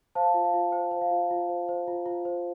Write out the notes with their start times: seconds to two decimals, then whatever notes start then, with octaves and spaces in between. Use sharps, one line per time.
0.15 C5 F5 A5
0.34 F4
0.45 F5
0.54 F4
0.72 C5 G5
0.91 C5
1.01 F5
1.11 F4
1.31 F4
1.49 C5
1.69 C5
1.88 F4
2.06 F4
2.25 C5